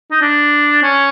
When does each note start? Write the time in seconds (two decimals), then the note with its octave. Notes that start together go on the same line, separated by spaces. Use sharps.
0.11 D#4
0.21 D4
0.82 C#4